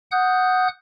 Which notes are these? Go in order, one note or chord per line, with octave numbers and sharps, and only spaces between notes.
F#5 D#6 F#6 G6